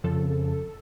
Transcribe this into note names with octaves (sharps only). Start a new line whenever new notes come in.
F2 C#3 F3 A4